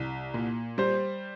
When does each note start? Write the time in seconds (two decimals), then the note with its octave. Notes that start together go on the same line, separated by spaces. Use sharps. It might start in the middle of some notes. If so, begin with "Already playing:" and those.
Already playing: C2
0.34 A#2
0.78 G3 C5